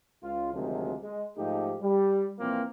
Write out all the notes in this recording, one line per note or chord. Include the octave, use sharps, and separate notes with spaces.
C#2 F4
D2 C3 D#3 F3 F#3 G#3
G#3
G#2 F3 A3 D#4 G4
G3
A#2 E3 F3 A#3 C4